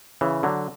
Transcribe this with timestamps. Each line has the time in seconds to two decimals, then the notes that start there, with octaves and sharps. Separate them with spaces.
0.21 C#3 E3
0.43 D3 F#3